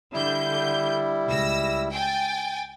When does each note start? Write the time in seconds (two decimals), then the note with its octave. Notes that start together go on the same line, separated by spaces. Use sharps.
0.13 D3 G3 E4 G6
1.27 C#2 E6 A#6
1.92 G5 G#5 A6